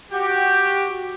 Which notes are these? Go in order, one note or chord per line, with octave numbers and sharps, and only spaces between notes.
F#4 G4